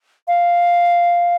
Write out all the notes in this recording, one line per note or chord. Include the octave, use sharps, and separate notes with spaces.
F5